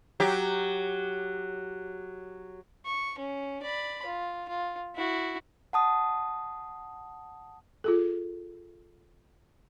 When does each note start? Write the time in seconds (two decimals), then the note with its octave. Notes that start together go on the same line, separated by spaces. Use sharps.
0.20 F#3 G4
2.86 C#6
3.19 C#4
3.62 D5 B5
4.06 F4
4.48 F4
4.96 E4 F#4
5.73 F#5 A5 D#6
7.84 F4 G#4 A4